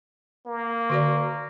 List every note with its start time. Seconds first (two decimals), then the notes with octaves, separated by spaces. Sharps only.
0.47 A#3
0.90 D3 F#4 D5